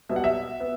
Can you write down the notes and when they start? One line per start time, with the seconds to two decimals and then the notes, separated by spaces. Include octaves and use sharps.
0.09 B1 B2 G3 B3 E5
0.16 F#5
0.24 E5
0.60 B3